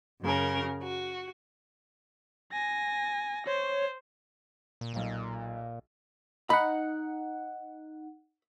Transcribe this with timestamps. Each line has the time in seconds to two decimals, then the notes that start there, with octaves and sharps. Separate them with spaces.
0.22 F#2 C#3 A#4
0.84 F#4
2.52 G#5 A#6
3.47 C5 C#5
4.81 A#2
4.94 B1 A#2 F5
6.50 D#4 F#5 B5